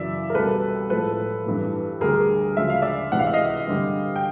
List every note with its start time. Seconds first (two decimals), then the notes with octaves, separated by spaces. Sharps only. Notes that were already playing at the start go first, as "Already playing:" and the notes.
Already playing: F#2 C#3 E3 D5 E5
0.30 A#4
0.35 C2 B2 G3 A4 B4
0.90 A2 F3 G#3 A4 B4
1.46 G2 E3 G3
2.01 D2 D3 G3 G#4 A#4
2.57 D2 C#3 F3 G#3 E5
2.70 F5
2.82 D5 E5
3.12 C#2 C3 E3 G#3 F#5
3.19 F5
3.27 E5
3.33 D#5 F5
3.67 G2 D3 G3
4.16 G5